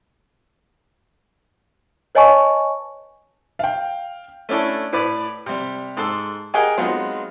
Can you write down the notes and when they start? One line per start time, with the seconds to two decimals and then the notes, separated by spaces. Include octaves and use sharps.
2.15 B4 C#5 D#5 G#5 A5 C#6
3.59 F5 G5
4.49 A3 C#4 D4 E4 A4
4.93 A2 B4 D5
5.46 C3 G3
5.97 G#2 A4 C6 E6
6.54 G4 G#4 A#4 D#5 F#5 G#5
6.78 F#3 G#3 B3 C4 D#4 F4